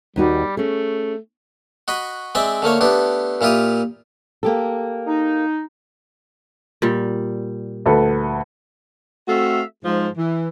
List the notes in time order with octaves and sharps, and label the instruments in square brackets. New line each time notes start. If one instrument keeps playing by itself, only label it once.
[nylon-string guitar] D#2 D#4 F#4 [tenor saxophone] G3
[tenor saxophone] A3 [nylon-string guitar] C#4 G#4
[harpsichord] F#4 D#5 B5
G#3 C4 D5 E5 G5
D3 A3 A#3 C#5
A3 B3 D4 G4
A#2 E4 F4 G4 D#6
[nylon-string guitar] A#3 G4 A4
[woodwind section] D#4
[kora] A#2 G3
[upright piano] D2 A4 B4
[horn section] A3 C4 F#4 A4 E5 F5
G#2 F3
E3